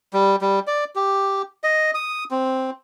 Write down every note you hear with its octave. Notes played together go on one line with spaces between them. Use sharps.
G3
G3
D5
G4
D#5
D#6
C4